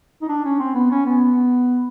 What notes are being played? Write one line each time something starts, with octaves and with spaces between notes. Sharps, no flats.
D#4
D4
C#4
C4
B3
C#4
B3